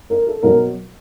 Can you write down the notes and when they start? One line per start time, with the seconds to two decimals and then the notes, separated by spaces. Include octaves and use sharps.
0.10 A#4
0.27 A4
0.43 B2 F#3 A#4